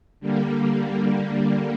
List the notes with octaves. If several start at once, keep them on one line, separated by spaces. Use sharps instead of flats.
D3 G3 A#3